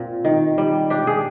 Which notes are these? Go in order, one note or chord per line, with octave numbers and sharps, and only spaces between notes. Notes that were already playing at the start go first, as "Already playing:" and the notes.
Already playing: A#2 C4
D#3
G3
D4 G4
G#4